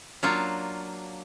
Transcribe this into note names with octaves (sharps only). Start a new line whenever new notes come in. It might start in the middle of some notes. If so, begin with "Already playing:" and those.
F#3 A#3 D4 F4